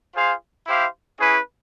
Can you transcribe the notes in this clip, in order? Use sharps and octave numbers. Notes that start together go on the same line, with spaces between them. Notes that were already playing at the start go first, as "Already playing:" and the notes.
F4 G#4 C5 F5
E4 G4 C5 F5
C#4 E4 G#4 B4